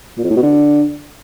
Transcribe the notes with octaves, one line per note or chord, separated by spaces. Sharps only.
A#2
F2
A2
B2
D3